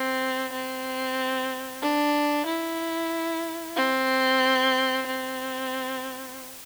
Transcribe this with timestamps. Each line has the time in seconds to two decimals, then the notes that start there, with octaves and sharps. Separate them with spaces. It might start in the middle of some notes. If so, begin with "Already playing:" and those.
Already playing: C4
0.53 C4
1.82 D4
2.46 E4
3.76 C4
5.07 C4